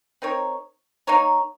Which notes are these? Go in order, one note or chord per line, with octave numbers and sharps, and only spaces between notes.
C4 D#4 A#4 C#5
A#3 D#4 A#4 C#5